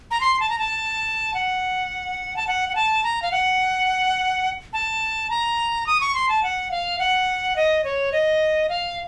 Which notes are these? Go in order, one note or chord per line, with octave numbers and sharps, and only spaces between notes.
A#5
C6
A5
A#5
A5
F#5
A5
F#5
F#5
A5
A#5
F5
F#5
A5
A#5
D#6
C#6
C6
A5
F#5
F5
F#5
D#5
C#5
D#5
F5